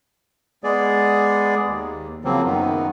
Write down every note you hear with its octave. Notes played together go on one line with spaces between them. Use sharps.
G#3 B3 G#4 D5
D#2
C#3 F3 F#3 A#3 C4
F#2 D#3 B3